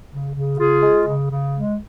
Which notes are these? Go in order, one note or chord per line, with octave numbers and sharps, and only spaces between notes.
C#3
C#3
C#3 F4 G#4
G#3
C#3
C#3
G#3